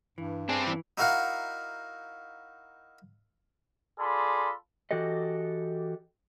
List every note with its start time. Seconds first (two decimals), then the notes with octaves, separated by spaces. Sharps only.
0.18 G2 E3
0.49 G3 C4 D4 G#4
0.67 E3
0.98 D#4 E4 F#4 A#4 F5 F#5
3.99 F4 G#4 A4 D5 B5 C6
4.91 E3 F#4 G4 A4 D#5